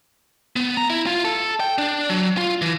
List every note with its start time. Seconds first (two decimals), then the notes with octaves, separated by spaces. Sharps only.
0.56 B3
0.77 A#5
0.90 E4
1.07 F4
1.25 A4
1.60 G5
1.78 D4
2.10 F#3
2.38 F4
2.62 E3